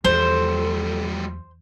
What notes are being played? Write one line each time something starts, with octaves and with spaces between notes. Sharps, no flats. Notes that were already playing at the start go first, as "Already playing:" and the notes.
E2 F3 G3 A4 C5